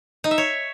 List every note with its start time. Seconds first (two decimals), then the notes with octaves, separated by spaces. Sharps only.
0.24 D#4
0.31 E5
0.38 C#5